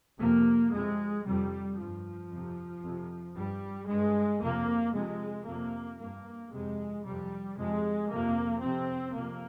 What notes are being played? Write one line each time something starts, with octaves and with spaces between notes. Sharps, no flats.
F2 C3 A#3
F2 C3 G#3
F2 C3 G3
G2 F3
F2 C3
F2 C3
G2 G3
G2 G#3
F2 C3 A#3
F2 C3 G#3
F2 C3 A#3
G2 A#3
F2 C3 G#3
F2 C3 G3
F2 C3 G#3
F2 C3 A#3
F2 C3 C4
F2 C3 A#3